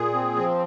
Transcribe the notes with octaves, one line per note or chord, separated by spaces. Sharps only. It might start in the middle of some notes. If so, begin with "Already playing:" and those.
Already playing: A#2 G#4
C4
F3